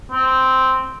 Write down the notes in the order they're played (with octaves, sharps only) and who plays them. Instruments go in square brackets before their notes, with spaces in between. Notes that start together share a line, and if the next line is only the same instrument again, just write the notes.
[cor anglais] C4